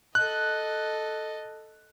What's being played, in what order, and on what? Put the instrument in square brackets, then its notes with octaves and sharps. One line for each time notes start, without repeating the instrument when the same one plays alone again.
[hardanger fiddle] A4 D#5 [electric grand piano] F#6